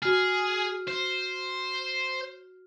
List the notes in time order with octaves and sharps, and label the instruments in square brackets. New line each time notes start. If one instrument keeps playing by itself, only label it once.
[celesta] F#4 F6 [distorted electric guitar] G#4
[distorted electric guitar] C5